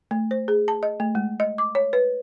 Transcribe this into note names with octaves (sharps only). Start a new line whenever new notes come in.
A3
C5
G#4
A5
D#5
A3
G#3
D#5
D6
C#5
B4